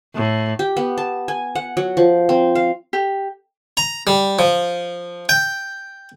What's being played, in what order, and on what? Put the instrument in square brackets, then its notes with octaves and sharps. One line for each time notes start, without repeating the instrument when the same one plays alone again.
[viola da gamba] A2
[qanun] G4
B3
A5
G#5
F#5
F#3
F3
C4
F5
[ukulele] G4
[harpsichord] A#5
G3
F3
G5